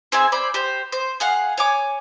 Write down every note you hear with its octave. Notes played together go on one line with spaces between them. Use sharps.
C4 G#4 E5 G#5
C5 D5 B5
G4 C5
C5
G#4 F5 F#5
C#5 G#5 D6